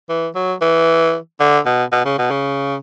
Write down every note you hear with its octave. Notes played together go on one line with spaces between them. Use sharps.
E3
F#3
E3
D3
B2
B2
C#3
B2
C#3